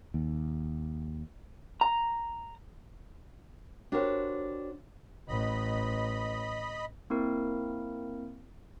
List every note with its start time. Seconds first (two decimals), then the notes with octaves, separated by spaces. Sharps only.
0.14 D#2
1.81 A#5
3.92 D4 F#4 G4 A#4 C5 C#5
5.28 A1 D#5 B5
7.10 A#3 C4 E4 A#4